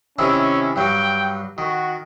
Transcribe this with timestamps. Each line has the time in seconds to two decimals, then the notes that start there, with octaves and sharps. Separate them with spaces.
0.19 C3 D#3 C#4 E4
0.76 G2 F#3 G5
1.58 D#3 F#4